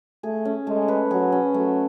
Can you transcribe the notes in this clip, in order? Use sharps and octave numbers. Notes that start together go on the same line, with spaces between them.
A3 G#4
C#4
G#3 A3
B4
F#3 G#4
C#4
F#3 A3